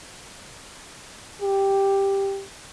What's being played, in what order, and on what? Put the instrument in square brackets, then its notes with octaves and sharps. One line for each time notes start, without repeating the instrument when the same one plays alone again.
[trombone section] G4